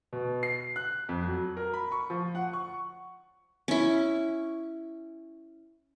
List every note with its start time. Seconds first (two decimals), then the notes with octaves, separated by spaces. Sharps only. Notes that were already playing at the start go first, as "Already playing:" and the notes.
0.13 B2
0.43 C7
0.76 F#6
1.09 F2
1.27 F#3
1.57 A#4
1.74 B5
1.92 C#6
2.10 F3
2.35 F#5
2.53 C#6
3.68 C#4 E4